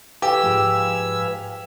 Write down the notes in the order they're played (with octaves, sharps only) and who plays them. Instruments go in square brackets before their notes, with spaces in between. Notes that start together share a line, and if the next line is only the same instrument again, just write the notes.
[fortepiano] G4 [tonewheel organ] B4 F5 G#5 [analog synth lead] E6
[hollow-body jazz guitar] G#2 F3 G#3